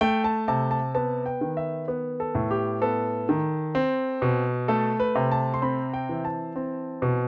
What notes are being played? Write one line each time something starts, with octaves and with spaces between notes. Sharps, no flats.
A3 G5
A5
C3 A5
A5
B3 A5
G5
D#3
E5
B3
A4
A2
G4
B3 A4
D#3
C4
B2
A3 A4
B4
C3
A5
C6
C4 B5
G5
E3
A5
C4
B2